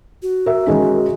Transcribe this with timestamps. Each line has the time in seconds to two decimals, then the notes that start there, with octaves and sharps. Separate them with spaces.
0.22 F#4
0.46 A#4 E5
0.67 D#3 G#3 C#4